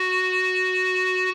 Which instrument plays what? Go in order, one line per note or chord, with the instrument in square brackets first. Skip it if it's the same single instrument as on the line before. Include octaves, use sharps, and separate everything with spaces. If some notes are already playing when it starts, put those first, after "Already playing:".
Already playing: [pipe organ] F#4